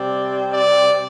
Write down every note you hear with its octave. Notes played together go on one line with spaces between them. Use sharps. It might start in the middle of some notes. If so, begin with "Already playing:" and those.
Already playing: C3 G3 C4 D5
D5